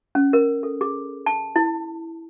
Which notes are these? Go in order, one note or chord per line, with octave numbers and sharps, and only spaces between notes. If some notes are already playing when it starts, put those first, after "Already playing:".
C#4
A#4
A4
G#4
A5
E4